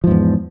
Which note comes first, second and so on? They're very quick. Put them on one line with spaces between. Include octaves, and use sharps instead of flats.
F3 G#2 E2